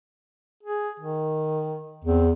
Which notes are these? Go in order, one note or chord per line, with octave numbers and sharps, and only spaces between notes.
G#4
D#3
E2 C4